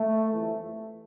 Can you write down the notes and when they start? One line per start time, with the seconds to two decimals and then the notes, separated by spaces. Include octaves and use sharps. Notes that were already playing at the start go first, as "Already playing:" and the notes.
Already playing: A3
0.33 G1 F2 E3